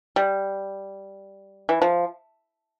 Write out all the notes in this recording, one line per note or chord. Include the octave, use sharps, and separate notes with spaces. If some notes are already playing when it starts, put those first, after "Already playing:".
G3
E3
F3